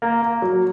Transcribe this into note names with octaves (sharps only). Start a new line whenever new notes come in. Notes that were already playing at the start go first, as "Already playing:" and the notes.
A#3
A#3
F#3